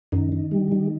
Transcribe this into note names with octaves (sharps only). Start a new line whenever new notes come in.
F#2 D#3
D#3
G3
D#3